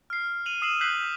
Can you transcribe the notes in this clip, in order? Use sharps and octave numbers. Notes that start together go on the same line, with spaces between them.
F6 C7
D#7 F7 F#7
D#6 E6 C7 D#7 E7 F#7
E6 F#6 G6 B6 C7 F#7